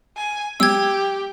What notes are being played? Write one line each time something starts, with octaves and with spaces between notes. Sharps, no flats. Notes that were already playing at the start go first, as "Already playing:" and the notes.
G#5
F#3 G#3 B3 G4 E6 G#6